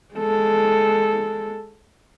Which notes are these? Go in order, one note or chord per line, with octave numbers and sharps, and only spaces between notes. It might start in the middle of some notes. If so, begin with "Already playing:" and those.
G#3 A4